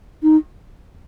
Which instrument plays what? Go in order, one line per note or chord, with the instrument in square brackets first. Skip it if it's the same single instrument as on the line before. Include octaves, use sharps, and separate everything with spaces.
[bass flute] D#4